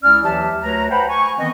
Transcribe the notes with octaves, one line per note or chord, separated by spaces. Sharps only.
C#2 C#4 E4 D5 E6 F6
D#2 E3 F#3 G4 E5 A5
D2 A3 B4 C#5 A#5
B4 C5 F#5 G5 A5 B5
G#5 C#6
D#3 E3 B3 C4 D#5